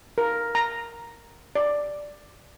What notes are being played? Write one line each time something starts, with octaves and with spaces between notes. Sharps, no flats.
A#4
A#5
D5